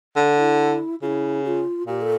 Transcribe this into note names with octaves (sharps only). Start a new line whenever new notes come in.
D3
E4
C#3 E4 F4
G4
F4
A#2 G4
A4